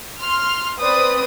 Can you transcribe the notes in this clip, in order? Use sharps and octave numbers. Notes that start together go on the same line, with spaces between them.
C6 F6
C4 B4 C5 D5 D#6